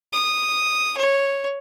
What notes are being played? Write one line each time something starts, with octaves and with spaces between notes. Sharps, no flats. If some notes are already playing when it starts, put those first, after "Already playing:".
D#6
C#5